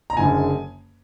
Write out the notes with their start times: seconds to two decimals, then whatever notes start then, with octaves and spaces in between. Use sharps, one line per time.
0.10 A#5
0.17 F#1 F#2 D3 G#3 G#5